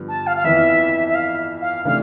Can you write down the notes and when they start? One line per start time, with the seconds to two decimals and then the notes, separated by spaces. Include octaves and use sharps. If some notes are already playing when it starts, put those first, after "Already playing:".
Already playing: G2 D3 F3 B3
0.09 A5
0.27 F5
0.37 F5
0.44 F2 E3 B3 E4 E5
1.08 E5
1.15 F5
1.62 F5
1.85 C3 E3 A3 D4 F5